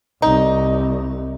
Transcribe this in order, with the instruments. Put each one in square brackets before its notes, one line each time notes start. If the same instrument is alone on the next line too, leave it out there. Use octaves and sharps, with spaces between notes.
[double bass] C2 [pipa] D#4